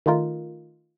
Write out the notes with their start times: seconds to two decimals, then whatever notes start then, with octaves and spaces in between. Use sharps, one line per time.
0.06 D#3 A3 D#4 F4 A#4